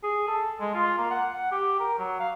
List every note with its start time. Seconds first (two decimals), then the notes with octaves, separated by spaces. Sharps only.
0.03 G#4
0.28 A4
0.60 G#3
0.74 F4
0.98 A#3
1.10 F#5
1.33 F#5
1.51 G4
1.80 A#4
1.98 F#3
2.20 F5